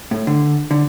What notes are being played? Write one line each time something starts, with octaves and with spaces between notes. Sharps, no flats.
A2
D3
D3